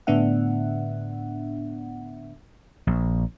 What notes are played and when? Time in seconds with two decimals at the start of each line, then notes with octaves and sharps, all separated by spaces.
0.07 A2 D3 B3 D4 E5 F#5
2.87 A#1